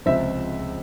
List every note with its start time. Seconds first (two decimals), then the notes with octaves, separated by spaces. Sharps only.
0.06 C#2 C3 F3 G#3 C5 E5